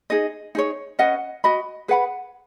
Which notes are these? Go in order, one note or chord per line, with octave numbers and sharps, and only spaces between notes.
D#4 G#4 D#5
D#4 G#4 C#5
C#4 B4 D#5 F#5
F#4 D#5 B5
G#4 B4 F#5 B5